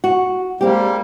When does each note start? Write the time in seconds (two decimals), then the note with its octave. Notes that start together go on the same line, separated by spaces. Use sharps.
0.04 F#4
0.61 G3 G#3 A#3 C4 G4